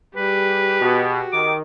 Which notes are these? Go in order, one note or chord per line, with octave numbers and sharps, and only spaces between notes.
G3 G4 G#4 B4
B2 F#4
D#3 D6